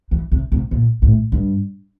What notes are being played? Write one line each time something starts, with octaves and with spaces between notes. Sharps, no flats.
E3
C3
C3
A#2
A2
G2